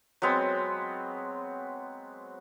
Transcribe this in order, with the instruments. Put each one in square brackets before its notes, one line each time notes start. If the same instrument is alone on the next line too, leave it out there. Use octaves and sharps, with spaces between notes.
[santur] F#3 G#3 B3 C4